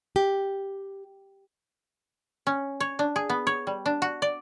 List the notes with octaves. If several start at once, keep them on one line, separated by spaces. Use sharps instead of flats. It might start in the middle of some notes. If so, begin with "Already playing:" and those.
G4
C#4
C#5
D4
G#4
B3
C#5
G3
D4
F#4
D5